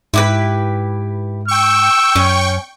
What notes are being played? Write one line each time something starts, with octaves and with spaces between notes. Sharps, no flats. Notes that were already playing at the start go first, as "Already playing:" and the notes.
G#2 E4 G4 B4
G5 C#6 E6
F#2 C#4